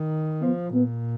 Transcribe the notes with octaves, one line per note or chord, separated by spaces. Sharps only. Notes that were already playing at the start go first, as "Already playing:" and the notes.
Already playing: D#3
F3 B3
A#2 B3